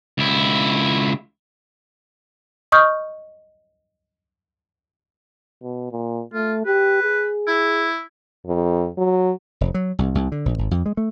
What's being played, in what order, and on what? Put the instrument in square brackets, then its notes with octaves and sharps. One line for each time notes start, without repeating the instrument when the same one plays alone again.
[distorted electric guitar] C#2 E4
[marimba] D#5 C#6 D#6 F6 G6
[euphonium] B2
A#2
[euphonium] A3 [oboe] F4
[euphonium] G4 [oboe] B4
[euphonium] G#4
[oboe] E4
[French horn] F2
F#3
[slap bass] F1
F#3
C2
C2
D3
A#1
G#1
F2
G#3
A3